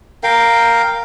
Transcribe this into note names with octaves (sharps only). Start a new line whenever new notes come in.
A#4 F5 G5